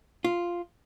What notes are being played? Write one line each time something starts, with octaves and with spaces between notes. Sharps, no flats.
F4